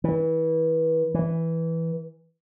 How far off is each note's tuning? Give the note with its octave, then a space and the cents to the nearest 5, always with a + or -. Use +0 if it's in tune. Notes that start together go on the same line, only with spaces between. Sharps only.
E3 -30
E3 -5